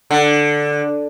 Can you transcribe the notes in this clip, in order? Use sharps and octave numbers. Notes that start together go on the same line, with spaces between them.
D3